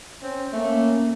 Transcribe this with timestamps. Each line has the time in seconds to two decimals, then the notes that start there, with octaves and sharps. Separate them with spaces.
0.23 C4 C#4
0.53 A3 A#3 C#4